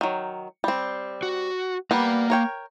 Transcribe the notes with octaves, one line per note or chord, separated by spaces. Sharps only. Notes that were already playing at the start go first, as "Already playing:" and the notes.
D#3 F#3
G3 C4
F#4
G3 A#3 B3 A#5
A#4 C#5 G5